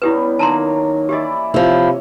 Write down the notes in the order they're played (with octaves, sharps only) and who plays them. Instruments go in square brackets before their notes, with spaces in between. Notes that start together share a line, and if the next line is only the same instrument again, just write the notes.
[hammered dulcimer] G3 B3 C#4 [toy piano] E4 G4 B4
[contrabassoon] D#3 [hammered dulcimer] F#3 A#3 [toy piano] A5 A#5 C6
[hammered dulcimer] E3 E4 D5 [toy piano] G4 D#5
[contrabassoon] C3 [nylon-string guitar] F3 E4 [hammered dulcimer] C#5